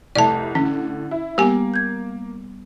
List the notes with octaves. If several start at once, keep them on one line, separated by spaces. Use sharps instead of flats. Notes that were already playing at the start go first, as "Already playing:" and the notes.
F1 C2 A3 D5 A5
A2 D3 C#4
E4
G3 A#3 B3 G4 G#5
G6 G#6